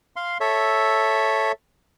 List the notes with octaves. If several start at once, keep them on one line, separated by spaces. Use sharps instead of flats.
F5 C6
A4 C#5 E5